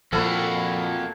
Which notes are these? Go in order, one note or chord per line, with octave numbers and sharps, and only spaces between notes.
F2 A#2 F3 A#3 E4 F#4 A4 B4